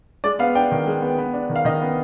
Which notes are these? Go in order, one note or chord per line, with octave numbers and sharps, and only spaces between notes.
G#3 D5
B3 F5
D4 G5
D#3
G#3
B3
B3
D4
D#3
F5
D#3 D#5
B3